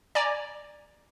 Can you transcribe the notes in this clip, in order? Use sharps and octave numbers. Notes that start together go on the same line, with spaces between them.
D5 G#5 A#5 D6